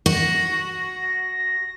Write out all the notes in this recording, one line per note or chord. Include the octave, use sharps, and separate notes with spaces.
F#4 A#6